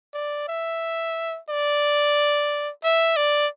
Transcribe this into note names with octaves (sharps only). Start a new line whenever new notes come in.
D5
E5
D5
E5
D5